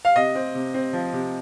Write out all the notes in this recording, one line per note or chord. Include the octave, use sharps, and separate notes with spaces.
F5
C3 D#5
C4
C3
C4
F3
C3